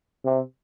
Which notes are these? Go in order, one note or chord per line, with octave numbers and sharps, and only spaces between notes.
C3